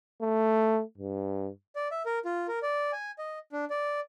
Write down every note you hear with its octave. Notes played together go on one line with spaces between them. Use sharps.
A3
G2
D5
E5
A#4
F4
A#4
D5
G#5
D#5
D4
D5